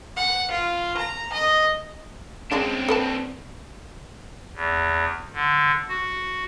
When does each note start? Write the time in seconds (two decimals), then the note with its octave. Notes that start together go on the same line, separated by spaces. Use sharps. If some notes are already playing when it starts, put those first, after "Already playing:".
0.17 F#5
0.51 F4
0.97 A#5
1.33 D#5
2.52 C#3 G#3 C4 D4 A5
2.88 A4 B4 A5
4.54 E2
5.33 D3
5.88 F#4